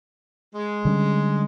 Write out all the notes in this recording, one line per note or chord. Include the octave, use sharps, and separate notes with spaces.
G#3
D3 G3 C#4